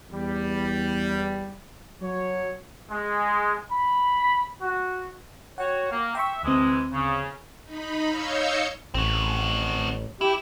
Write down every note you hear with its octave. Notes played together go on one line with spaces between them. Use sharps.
E2 G3
F#3 C#5
G#3
B5
F#4
F#4 C#5 F#5 G5
A#3
E5 G5 C6 C#6
D2 C3 E3 G#3 C4
C#3
D#4 B5
C#5 D#5 F5 E6 G6 C#7
A1 C4 F#4
E4 G4